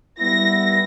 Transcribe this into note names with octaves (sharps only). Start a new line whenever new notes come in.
G3 B3 E4 A#6